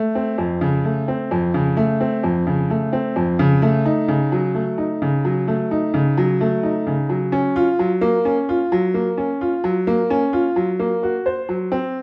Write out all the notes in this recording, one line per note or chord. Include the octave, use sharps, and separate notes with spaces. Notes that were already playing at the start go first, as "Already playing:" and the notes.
Already playing: A3
C4
F2
C#3
A3
C4
F2
C#3
A3
C4
F2
C#3
A3
C4
F2
C#3
A3
D#4
C#3
F#3
A3
D#4
C#3
F#3
A3
D#4
C#3
F#3
A3
D#4
C#3
F#3
C#4
F4
F#3
A#3
C#4
F4
F#3
A#3
C#4
F4
F#3
A#3
C#4
F4
F#3
A#3
F#4
C5
F#3
C4